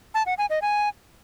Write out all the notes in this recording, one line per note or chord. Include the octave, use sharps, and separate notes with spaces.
A5
F#5
G#5
D#5
G#5